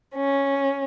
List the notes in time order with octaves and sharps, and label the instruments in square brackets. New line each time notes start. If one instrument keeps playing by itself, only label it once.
[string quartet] C#4